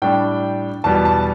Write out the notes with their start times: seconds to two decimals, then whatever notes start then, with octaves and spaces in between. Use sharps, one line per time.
0.02 A2 G3 D4 G5
0.84 E2 B2 G3 A5
1.05 A5